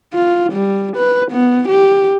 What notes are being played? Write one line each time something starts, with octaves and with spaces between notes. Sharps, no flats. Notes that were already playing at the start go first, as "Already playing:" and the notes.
F4
G3
B4
B3
G4